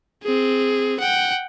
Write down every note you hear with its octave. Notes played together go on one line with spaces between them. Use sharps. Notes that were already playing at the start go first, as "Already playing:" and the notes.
C4 G#4
F#5 G5